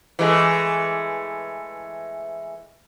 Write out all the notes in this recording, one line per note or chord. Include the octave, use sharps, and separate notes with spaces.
E3 G#3 A3